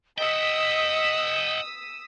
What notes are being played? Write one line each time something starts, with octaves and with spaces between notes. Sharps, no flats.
D#5 F#5 G5 D#6 E6 B6